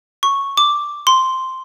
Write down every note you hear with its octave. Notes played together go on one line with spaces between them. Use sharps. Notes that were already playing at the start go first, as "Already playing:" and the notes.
C#6
D6
C6